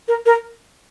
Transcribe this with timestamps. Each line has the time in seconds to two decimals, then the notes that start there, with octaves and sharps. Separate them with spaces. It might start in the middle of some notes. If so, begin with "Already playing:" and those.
0.08 A#4
0.26 A#4